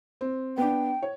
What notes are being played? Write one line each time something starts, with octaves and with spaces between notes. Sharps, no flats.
C4
B3 D4 G5
C#5